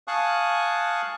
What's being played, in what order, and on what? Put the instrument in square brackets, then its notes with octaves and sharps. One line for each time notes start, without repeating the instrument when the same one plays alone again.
[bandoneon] F5 G#5 A5 C#6 D#6 F#6